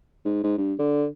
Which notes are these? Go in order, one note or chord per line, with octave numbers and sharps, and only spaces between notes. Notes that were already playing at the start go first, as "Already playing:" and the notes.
G#2
G#2
G2
D3